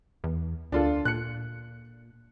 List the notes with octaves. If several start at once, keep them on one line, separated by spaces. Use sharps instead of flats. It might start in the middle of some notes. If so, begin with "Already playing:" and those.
E2
D2 D4 F4 A4
A#2 F#6 C#7